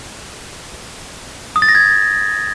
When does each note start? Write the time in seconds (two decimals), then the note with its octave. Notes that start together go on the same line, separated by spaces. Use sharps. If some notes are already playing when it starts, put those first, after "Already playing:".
1.56 D#6
1.62 A6
1.68 A#6
1.75 G#6